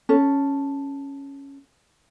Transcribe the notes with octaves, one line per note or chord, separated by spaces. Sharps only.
C#4 A4